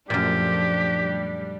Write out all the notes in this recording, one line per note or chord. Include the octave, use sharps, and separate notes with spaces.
F#2 A#2 F3 A3 D4 G4
G3